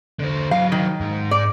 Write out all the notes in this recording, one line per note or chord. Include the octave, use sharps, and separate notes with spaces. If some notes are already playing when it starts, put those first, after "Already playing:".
D3 C5
F#3 E4 F5
D#3
G#2
D5